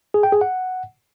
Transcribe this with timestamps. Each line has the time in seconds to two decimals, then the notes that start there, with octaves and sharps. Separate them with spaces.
0.14 G#4
0.23 G5
0.32 G#4
0.41 F#5